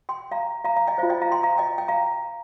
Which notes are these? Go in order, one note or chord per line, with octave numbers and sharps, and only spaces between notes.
G5 C6
F5 A#5
F5 A#5
F5 A#5
D#5 G5
F4 C5 F5
D#5 G5
F5 A#5
G5 C6
F5 A#5
D#5 G5
G5
F5 A#5